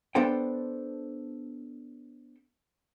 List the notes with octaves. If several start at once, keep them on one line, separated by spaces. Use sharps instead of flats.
B3 D4 A4 C5 G5